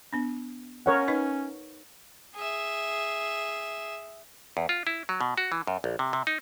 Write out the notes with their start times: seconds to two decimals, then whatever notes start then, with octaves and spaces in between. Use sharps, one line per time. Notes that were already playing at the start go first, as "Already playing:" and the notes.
0.13 B3 D4
0.86 C#4 A#4 C#5 F#5
1.08 D#4 B4 D#5
2.36 G#4 E5
4.57 E2
4.69 F4
4.87 E4
5.09 F#3
5.21 B2
5.38 F#4
5.52 E3
5.67 F#2
5.84 A#1
5.99 C3
6.13 C3
6.27 D#4